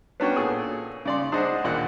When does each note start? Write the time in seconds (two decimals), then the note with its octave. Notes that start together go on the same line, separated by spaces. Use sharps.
0.20 B3 C#4 D4 F#4 C#5 G5
0.36 A#2 G#4 A4
1.05 C#3 D5 C6
1.32 D4 G#4 C5 D#5 F#5
1.64 D#2 A#2 D5 F#5